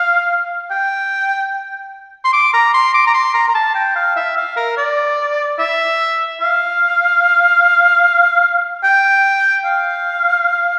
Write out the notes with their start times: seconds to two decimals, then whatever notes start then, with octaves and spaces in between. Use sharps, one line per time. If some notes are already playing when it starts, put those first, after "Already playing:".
Already playing: F5
0.71 G5
2.25 C6
2.33 D6
2.53 A#5
2.74 C6
2.94 D6
3.07 A#5
3.14 C6
3.34 A#5
3.48 A#5
3.55 A5
3.75 G5
3.96 F5
4.16 E5
4.37 F5
4.56 A#4
4.77 D5
5.59 E5
6.41 F5
8.84 G5
9.65 F5